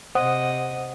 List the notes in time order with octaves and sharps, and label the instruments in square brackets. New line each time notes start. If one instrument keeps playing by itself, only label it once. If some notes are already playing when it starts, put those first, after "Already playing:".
[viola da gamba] C3 D#5 [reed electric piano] C5 F#5 D#6